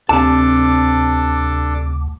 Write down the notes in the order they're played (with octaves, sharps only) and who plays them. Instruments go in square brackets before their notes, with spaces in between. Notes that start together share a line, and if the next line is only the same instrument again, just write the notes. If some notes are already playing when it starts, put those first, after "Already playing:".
[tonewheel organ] D2 [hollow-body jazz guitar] C3 A5 [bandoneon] D4 A4 D6